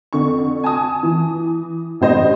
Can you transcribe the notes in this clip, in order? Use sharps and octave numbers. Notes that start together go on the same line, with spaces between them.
F2 D3 C#6
G#5 A5 D#6
E3
A1 G2 C5 D#5